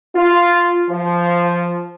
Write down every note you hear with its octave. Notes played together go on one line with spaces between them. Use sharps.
F4
F3